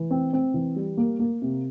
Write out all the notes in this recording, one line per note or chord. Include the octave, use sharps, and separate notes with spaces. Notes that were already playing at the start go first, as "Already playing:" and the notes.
Already playing: E3
C4
C4
E3
G3
A#3
A#3
C3